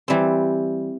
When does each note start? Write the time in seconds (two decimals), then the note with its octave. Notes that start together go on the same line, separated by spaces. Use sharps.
0.08 E3 G3 C4